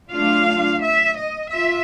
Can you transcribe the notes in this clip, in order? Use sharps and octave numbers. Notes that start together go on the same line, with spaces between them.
F#3 A3 D4 F4 F5
E5
D#5
F4 E5